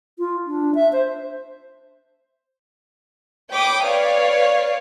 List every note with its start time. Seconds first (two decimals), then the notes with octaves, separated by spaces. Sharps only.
0.19 F4
0.47 D4
0.75 E5
0.93 C5
3.51 C#5 G5 B5 D6 D#6
3.84 B4 C#5 D5 F5